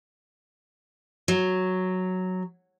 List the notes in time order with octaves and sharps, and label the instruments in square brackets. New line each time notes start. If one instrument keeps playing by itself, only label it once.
[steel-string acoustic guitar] F#3